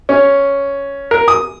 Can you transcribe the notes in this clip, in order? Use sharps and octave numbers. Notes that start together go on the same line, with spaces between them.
C#4
A#4
D#6